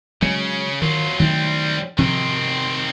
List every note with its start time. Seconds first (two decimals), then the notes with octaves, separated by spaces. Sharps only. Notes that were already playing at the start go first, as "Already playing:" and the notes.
0.22 C#3 F#3 G#3 C#4
0.82 D#3 F#3 F4
1.20 D#3 F#3 G3 A3 C4
1.98 C3 D#3 F3 C4